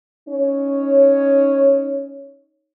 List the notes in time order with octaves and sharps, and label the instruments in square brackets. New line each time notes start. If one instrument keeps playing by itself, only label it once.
[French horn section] C#4 D#4 C#5